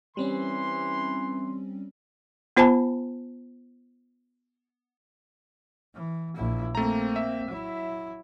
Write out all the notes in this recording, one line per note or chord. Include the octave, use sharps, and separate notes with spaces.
E3 G3 C4 C#4 C6
B3 F4 C5 G#5 A5 B5
E3
A#1 E4
A3 A#3 C4 A#5
E5
F#3 E4